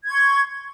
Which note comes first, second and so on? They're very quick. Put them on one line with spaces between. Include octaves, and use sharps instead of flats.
G#6 C6 C#6